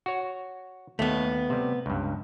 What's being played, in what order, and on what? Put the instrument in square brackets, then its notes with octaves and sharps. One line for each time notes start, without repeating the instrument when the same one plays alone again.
[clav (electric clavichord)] F#4 C#5
[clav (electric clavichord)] D#2 [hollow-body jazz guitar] A3 B3
[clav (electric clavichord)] C3 G3
C#2 G2